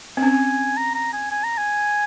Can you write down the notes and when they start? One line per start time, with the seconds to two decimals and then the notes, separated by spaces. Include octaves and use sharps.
0.17 C4
0.22 C#4 G#5
0.77 A#5
0.95 A#5
1.13 G#5
1.31 G#5
1.44 A#5
1.58 G#5